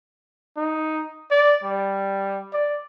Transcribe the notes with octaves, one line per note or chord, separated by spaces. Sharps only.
D#4
D5
G3
D5